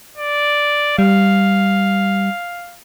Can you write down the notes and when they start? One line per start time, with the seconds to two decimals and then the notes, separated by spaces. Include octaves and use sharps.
0.18 D5
0.99 G3 F5